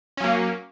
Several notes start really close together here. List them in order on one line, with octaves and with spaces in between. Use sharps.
C#4 F#3 A#3